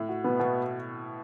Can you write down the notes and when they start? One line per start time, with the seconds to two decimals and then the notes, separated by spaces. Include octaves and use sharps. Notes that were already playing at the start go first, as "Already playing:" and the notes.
Already playing: A2
0.09 F#4
0.24 B2 B3
0.39 B2 F#4